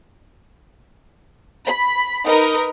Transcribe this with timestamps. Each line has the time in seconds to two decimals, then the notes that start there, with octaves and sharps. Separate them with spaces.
1.67 B5
2.26 D#4 A#4 B4 D#5